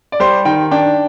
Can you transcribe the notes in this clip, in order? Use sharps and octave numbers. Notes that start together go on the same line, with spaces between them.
D5
G3 C5
D#3 G5
D4 G5